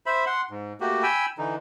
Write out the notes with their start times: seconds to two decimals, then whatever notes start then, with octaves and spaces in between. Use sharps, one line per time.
0.06 C5 E5 B5
0.26 F#5 C6
0.50 G#2
0.81 A3 A#3 F#4 G4
1.03 G5 G#5 B5 E6
1.38 D3 E3 D#4